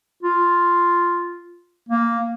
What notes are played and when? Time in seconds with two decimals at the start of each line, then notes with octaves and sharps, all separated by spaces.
0.23 F4
1.88 A#3